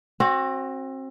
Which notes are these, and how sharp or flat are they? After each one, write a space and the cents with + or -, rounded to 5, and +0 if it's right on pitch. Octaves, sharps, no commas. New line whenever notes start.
C4 +30 F#4 +0